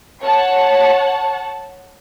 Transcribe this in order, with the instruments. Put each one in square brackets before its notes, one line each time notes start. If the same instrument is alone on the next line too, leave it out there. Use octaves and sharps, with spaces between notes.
[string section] C#5 F#5 A5